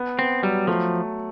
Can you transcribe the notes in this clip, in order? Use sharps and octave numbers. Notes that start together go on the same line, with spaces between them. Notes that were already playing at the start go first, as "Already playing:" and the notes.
Already playing: B3
B3 C4
F#3 G3
F3 A3